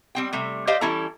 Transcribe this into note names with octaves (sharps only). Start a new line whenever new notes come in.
G3 C4 G5
C3 G3 A3
G4 C5 D5 D#5 F5
E3 G3 C#4 E4 A4 A#5